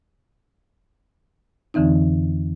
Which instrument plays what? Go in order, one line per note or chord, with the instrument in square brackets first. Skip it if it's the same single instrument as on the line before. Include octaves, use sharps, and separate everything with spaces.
[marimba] F2 D3 E3 C4 D#4